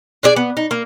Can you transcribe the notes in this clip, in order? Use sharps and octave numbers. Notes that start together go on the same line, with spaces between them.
D4 G#4 D5
B3
D#4
A#3